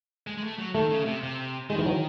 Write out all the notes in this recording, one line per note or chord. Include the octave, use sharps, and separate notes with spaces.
G#3
G#3
A3
F#3
D#3 A3
C#3
C3
C3
D#3 G#3
E3
F#3